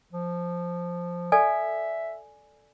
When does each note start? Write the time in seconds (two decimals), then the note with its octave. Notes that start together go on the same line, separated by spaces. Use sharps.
0.13 F3
1.32 A4 D5 E5 G#5